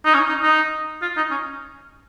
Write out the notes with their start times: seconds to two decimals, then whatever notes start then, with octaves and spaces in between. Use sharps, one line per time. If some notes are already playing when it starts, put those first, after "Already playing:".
0.05 D#4
0.14 C#4
0.29 D#4
0.43 D#4
1.02 F4
1.17 D#4
1.31 C#4